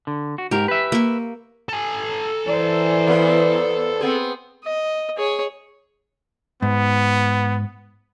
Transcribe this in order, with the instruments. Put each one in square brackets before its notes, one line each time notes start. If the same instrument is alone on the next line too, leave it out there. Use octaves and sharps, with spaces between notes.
[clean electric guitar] D3
F#4
[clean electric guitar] G#2 A#4 [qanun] G4
[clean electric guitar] B4 E5
[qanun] A#3 C#6
[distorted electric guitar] A4 G#5
[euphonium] E3 [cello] C5 D5
[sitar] E2 B3 B4
B3 C4 G#4
[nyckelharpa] D#5
G#4 C#5
[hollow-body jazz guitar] G#2 [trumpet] B3